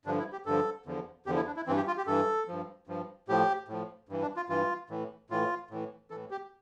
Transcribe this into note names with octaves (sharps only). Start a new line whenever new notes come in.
G2 D3 F3 D4
E4
G4
G2 D3 F3 A4
E2 D3 F3
E2 D3 F3 G4
E4
D4
E4
G2 E3 C4
G4
F4
G4
G2 E3 A4
G2 F3
G2 F3
A2 F3 G4
A2 F3
G2 E3
D4
F4
G2 E3 F4
A2 E3
A2 E3 F4
A2 E3
A2 E3 A4
G4